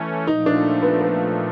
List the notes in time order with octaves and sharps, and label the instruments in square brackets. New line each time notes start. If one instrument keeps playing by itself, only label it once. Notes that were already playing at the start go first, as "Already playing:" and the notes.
Already playing: [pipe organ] E3 A3 C#4
[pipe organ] A#2 F3 A3 [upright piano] D#4
[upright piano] D4
B3
B3